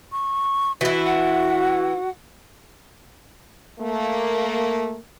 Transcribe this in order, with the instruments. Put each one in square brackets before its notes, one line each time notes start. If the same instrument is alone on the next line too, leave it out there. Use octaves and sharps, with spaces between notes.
[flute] C#6
[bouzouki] E3 E4 [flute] F#4
[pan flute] F#5
[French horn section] A3 A#3